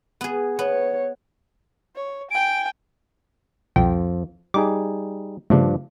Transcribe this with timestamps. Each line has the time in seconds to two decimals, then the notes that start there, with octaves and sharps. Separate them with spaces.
0.21 B3 G#4
0.59 B3 C#5
1.96 C#5
2.31 G5 G#5 D7
3.76 C2 F2 B2 F3 G5
4.54 G3 D#4 G#4 D6
5.50 G2 C#3 F3 A3 D4